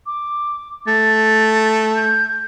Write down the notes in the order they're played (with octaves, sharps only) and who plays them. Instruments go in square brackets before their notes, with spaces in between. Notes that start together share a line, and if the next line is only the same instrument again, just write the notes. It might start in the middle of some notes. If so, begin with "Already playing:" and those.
[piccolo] D6
[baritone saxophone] A3 [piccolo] A6
[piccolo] G6